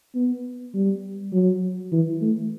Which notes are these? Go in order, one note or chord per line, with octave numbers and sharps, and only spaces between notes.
B3
G3
F#3
E3
A3